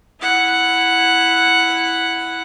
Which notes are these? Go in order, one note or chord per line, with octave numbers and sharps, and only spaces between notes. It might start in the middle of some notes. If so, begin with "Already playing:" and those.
E4 F#5